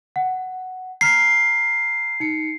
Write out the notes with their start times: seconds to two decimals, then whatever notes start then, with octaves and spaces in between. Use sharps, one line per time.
0.16 F#5
1.01 A#5 F6 B6 C7
2.20 D#4 C#7